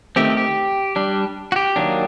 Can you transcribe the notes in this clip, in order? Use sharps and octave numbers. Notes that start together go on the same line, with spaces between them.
D#3 A3 C4 G4
G4
G3 D4
F#4
G4
D#3 F#3 A#3 D4